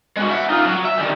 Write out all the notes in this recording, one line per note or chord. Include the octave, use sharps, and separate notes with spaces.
G#3 F#4
E5 F#5
D#4 F4
F#3
E5
D#3 G3